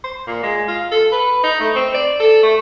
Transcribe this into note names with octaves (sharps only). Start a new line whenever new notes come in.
C5
A#2
G#3
F4
A4
B4
D#4
A3
C4
D5
A4
A3